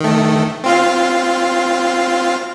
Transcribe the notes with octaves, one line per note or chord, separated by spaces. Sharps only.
D#3 A3
C4 F4 F5